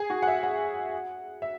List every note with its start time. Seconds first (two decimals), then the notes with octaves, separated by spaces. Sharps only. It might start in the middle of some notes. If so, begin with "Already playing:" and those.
Already playing: G#4
0.10 F#4
0.22 F#5
0.27 E5
0.43 F#5
1.42 E5